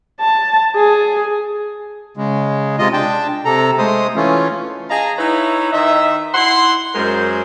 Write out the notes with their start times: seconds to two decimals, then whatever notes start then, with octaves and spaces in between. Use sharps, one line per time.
0.20 A5
0.76 G#4
2.17 C#3 G#3
2.79 C3 G#3 F4 D#5
2.93 D4 G5 A5
3.45 C3 A4 A#5
3.78 G#3 A3 C5 D#6
4.16 E3 A3 C#4 F4
4.90 G#4 D#5 F5 A5 A#5
5.18 D#4 E4 B4 C#5 E5
5.72 D#3 D#5 E5
6.34 E4 F#5 C6
6.95 F#2 G#3 A#4 C5